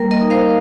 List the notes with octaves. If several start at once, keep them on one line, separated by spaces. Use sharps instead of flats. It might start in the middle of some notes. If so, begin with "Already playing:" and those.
Already playing: G3 A#3 A#4
A#4 D#5
D#4
C5 F5